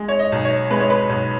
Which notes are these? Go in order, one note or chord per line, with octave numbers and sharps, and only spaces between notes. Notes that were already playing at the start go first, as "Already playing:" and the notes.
Already playing: G#3
C#5
D#5
B1
C#5
G#3 B4
C#5
B4
B1